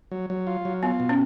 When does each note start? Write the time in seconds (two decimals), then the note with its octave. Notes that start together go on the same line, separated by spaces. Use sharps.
0.11 F#3
0.30 F#3
0.47 F4
0.65 F#3
0.83 B3 F4
1.00 B2
1.09 C#4